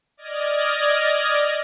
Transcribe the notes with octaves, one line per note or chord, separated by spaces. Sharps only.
D5 D#5 F6 G#6 A#6